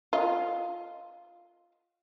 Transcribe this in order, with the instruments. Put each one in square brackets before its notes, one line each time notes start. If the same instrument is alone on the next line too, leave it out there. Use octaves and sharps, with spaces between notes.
[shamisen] F4 D#5